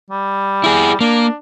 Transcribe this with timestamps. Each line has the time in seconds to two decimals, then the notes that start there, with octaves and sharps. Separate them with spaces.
0.10 G3
0.64 E4 G#4
1.01 A#3 D4